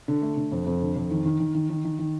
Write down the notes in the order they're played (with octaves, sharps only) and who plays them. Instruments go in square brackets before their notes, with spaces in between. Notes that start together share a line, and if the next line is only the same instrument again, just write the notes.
[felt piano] D3
A3
D3
F2
F2
D3
F2
D#3
D#3
D#3
D#3
D#3
D#3
D#3